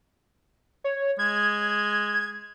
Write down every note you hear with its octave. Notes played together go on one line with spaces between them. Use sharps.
C#5
G#3 G#6